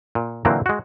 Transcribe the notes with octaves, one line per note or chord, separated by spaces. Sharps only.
A#2
A#2 D3 E3 F#3 A#3 C4
G#3 F#4